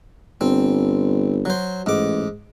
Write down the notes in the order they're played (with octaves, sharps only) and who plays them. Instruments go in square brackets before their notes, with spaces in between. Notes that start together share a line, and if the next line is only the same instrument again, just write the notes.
[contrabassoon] G1 [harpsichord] C4
[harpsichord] F#3 C5
[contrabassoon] A1 [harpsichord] G#2 D6